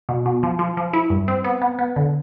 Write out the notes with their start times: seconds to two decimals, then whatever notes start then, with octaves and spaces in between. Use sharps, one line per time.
0.09 B2
0.26 B2
0.43 F3
0.59 F3
0.77 F3
0.93 E4
1.10 G2
1.28 C4
1.44 B3
1.62 B3
1.79 B3
1.96 D3